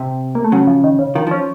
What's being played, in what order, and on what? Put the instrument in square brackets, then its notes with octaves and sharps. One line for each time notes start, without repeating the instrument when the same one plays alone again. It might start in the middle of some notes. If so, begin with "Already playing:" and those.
Already playing: [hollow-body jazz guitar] C3
[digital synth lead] A#3
A3
[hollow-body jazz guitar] C#3 [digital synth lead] F#3
[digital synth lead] F3
D#3
C#3
[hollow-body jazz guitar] D#3 [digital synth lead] F3
[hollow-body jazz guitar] F3 [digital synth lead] C#4